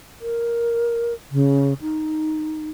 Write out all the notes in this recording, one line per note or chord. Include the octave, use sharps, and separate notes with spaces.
A#4
C#3
D#4